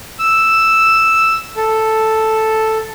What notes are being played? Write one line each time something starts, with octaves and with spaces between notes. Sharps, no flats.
E6
A4